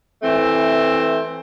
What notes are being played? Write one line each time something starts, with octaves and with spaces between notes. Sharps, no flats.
E3 A3 C4